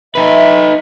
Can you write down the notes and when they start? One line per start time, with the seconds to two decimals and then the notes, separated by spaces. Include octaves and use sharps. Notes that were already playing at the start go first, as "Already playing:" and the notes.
0.15 D#4 B4 E5